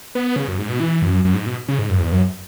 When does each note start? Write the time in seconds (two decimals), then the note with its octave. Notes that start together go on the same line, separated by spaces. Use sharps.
0.15 B3
0.36 C#3
0.48 F#2
0.58 G#2
0.69 B2
0.80 E3
1.02 F#2
1.25 F#2
1.34 G#2
1.46 B2
1.68 C#3
1.79 G#2
1.90 F#2
2.00 E2
2.12 F#2